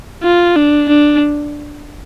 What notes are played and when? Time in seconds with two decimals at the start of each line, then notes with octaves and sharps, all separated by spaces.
0.23 F4
0.56 D4
0.89 D4